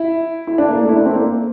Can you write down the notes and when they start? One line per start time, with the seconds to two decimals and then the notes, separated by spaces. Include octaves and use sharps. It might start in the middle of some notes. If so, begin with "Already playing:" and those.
Already playing: E4
0.47 E4
0.58 D4
0.69 A#3
0.80 A3
0.89 E4
0.97 D4
1.05 C4
1.13 A#3